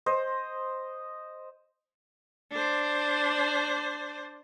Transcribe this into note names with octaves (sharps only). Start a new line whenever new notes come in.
C5 D#5
D4 C5